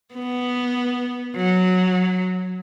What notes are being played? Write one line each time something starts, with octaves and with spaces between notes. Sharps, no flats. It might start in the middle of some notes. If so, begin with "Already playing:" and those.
B3
F#3